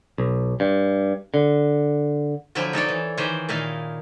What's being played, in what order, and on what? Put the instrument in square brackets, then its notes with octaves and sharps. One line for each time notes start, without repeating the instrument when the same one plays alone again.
[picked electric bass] B1
G2
D3
[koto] D3 F3 F#3 E4 G5 G#5
D#4 A4 C#5 D5
E3
D#3 E3 G4 G#4 C5 C#5
A#2 D#3 D#4 E4 F5